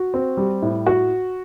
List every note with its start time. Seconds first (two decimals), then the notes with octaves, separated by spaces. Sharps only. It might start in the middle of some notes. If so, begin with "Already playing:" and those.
Already playing: F#4
0.14 C4
0.37 G3
0.62 A2
0.86 F#4